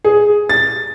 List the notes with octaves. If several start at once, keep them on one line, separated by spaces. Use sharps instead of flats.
G#4
A6